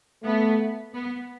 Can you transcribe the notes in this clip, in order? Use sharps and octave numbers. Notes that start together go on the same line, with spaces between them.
A3 B3
B3